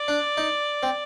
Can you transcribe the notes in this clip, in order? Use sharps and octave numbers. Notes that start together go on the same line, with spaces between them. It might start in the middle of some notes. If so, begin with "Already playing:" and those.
Already playing: D5
D4
D#4
C4